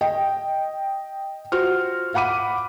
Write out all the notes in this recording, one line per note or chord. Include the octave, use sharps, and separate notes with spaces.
D#5 G5
F4 F#4 C5 F6
F5 F#5 B5 D6 D#7